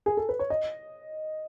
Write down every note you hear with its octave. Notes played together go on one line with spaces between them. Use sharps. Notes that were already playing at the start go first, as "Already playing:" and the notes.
G#4
A4
B4
C#5
D#5